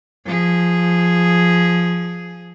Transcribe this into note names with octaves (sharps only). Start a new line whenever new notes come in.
F3 G#4